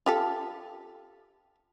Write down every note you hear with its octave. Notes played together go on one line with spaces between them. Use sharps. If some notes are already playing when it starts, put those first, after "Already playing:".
F4 G4 A4